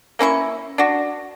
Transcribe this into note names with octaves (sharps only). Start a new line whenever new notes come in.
A#3 C#4 E4 C#6
D4 F#4